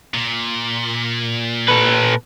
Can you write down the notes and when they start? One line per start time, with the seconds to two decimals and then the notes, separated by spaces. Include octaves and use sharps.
0.14 A#2
1.69 A4 B4